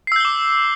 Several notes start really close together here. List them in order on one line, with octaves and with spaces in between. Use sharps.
C7 E6 G6 G7 D6